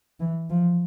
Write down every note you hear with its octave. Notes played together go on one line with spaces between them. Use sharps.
E3
F3